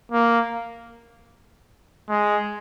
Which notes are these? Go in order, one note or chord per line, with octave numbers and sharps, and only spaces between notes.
A#3
G#3